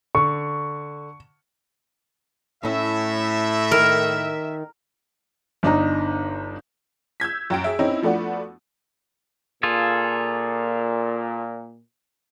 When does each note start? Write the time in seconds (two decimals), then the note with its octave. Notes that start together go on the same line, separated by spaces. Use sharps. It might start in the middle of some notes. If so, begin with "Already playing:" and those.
0.15 D3 C#6
2.63 A2 C#4 E4 E5
3.71 D#3 A#4
5.63 G1 D4 D#4 A#5
7.20 E6 G6 G#6 B6
7.50 F#2 G5 D7
7.64 G#4 E5
7.79 C4 C#4 D#4 E4
8.02 F3 A3 B3 D4 F#4
9.63 A#2 F4 G#4 A4